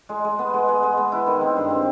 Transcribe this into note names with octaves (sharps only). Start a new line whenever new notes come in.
G#3
G#3
B3
G#3
G#3
G#3
B3
E4
D#3
C4
G2
C4